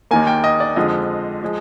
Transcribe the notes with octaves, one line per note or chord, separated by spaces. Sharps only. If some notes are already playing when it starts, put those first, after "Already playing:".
D#2 D#3 A#3 G#5
G5
D#5
D5
F2 D3 F3 G#3 D#5
F3 G#3